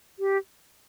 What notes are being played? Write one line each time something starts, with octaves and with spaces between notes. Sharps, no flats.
G4